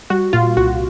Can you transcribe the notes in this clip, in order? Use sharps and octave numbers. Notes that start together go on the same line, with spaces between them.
G3 F#4
A#2 F4
C2 F#4